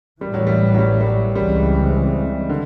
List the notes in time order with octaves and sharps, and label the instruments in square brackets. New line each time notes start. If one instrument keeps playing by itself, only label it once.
[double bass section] A1 A2 E3 [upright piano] G3
[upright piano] F#3
G3
F#3
G3
G3
F#3
[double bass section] C#2 C#3 E3 G#3 C4 [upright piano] G3
[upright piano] D3